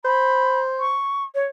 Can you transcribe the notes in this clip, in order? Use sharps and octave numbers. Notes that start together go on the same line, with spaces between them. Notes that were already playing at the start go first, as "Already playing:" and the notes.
C5 B5
C#6
C#5